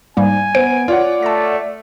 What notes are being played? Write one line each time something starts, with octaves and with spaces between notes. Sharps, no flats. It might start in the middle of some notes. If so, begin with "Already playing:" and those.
G#2 G3 A#3 G#5
B3 C5 D7
F4 C#5 D5 F#5
A3 A5 A#6